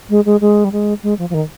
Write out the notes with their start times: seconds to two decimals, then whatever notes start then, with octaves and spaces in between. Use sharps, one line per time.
0.10 G#3
0.25 G#3
0.41 G#3
0.64 G3
0.72 G#3
1.03 G#3
1.19 F3
1.30 F3
1.34 D#3